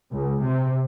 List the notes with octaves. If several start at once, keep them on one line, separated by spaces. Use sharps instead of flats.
C#2
C3